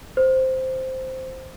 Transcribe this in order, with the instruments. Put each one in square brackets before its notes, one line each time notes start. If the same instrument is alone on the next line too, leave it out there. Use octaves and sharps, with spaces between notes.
[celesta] C5